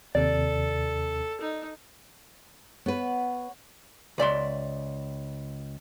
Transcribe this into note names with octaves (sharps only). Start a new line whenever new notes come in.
D#2 C3 A4 D5
D#4
B3 B4 C#5 F#5
C#2 D5 E5 C6